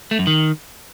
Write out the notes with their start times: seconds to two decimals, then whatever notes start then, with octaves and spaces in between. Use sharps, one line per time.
0.11 A3
0.19 F#2
0.27 D#3